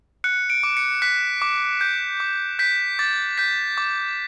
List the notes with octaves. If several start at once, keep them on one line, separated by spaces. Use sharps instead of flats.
F#6 C#7
D7
D6
C#7
F#6 B6
D6
G6
D6
G6 B6
D6 A6
G6 B6
D6